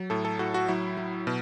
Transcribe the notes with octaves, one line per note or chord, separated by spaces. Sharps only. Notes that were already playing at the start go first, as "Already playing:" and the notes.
Already playing: F#3
A2 A4
A4
A2 F#4
F#4
F#3 E4
F#3
B2